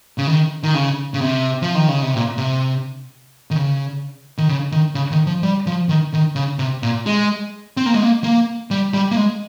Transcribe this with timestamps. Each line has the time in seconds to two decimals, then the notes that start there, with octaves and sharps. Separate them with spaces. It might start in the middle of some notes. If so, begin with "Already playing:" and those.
0.18 C#3
0.27 D#3
0.63 D#3
0.74 C#3
1.14 C#3
1.21 C3
1.62 F3
1.75 D#3
1.88 C#3
2.02 C3
2.15 A#2
2.38 C3
3.51 D#3
3.56 C#3
4.38 D#3
4.49 C#3
4.72 D#3
4.95 C#3
5.11 D#3
5.27 F3
5.43 G3
5.66 F3
5.89 D#3
6.13 D#3
6.36 C#3
6.59 C3
6.83 A#2
7.06 G#3
7.77 C4
7.86 A#3
7.94 G#3
8.03 A#3
8.24 A#3
8.71 G3
8.94 G3
9.11 A#3
9.16 G#3